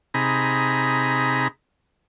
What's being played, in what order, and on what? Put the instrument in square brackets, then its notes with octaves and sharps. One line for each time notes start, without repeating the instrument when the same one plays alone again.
[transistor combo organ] C3 D#4 G#4 A#5 B5